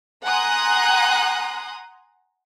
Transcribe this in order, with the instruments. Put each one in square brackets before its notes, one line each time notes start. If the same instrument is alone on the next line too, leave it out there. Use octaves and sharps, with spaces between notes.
[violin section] F#5 G#5 A#5 C6 D#6 F#6